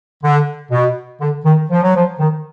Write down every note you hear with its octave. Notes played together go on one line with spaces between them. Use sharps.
D3
B2
D3
D#3
F3
F#3
F3
D#3